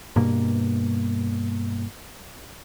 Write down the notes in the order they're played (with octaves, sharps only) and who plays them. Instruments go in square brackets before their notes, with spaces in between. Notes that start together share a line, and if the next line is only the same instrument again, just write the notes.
[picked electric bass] G2 B2 A#3